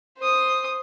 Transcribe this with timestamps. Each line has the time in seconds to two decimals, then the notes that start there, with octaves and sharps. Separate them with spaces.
0.18 C5 D#6